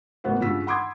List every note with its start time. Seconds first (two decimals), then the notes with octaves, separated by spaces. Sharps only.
0.24 A1 C#3 A#3 B3 F#4 C5
0.41 G2 C#3 F4 F#4 E6 B6
0.67 F#5 B5 C6 D6 D#6 G#6